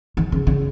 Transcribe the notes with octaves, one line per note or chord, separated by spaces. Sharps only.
D#3
C#3
C#3